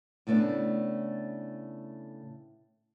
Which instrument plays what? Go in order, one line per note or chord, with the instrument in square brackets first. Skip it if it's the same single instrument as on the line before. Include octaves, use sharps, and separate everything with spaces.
[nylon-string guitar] A2 C#3 A3 B3 D4